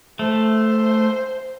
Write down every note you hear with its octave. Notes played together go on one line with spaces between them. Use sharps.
A3 C5